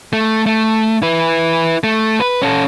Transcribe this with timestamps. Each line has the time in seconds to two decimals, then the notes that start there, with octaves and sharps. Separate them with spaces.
0.13 A3
0.46 A3
1.02 E4 B4
1.84 A3
2.20 B4
2.42 C#4 A4